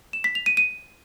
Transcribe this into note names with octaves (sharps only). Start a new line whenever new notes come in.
E7
B6
F7
D#7
D#7